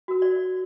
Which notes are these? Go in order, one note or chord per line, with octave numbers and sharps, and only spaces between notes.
F#4 A#4
D5